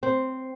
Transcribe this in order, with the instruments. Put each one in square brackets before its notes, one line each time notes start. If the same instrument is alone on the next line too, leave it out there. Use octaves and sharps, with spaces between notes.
[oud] C4